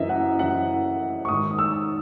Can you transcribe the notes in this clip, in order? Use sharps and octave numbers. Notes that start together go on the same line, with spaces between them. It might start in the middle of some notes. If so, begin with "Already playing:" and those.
Already playing: F#2 E3 D#5 E5
F#5
F#2 E3 F#5
C#6
G#2 D#3 D#6
E6